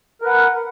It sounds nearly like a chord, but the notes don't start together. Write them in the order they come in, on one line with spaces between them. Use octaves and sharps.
A#4 B4 F#5